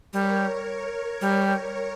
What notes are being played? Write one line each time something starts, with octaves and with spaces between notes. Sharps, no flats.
G3 A#4 C#5
G3